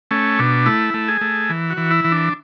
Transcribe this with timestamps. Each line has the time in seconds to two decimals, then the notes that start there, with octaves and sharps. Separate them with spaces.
0.11 A3 C#4
0.39 B2 D4
0.66 A3 E4
0.94 A3
1.08 G#4
1.21 A3
1.50 E3
1.70 F#4
1.77 E3
1.91 E4
2.04 E3
2.12 D4